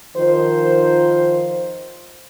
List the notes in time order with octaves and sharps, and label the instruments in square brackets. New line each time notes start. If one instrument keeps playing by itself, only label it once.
[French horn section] D#3 F3 C5